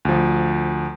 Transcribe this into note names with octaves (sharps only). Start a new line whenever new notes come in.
D2 F3